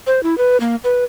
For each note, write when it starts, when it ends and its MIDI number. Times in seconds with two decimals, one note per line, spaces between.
0.07 0.23 72
0.23 0.38 64
0.38 0.57 71
0.60 0.76 58
0.84 1.04 71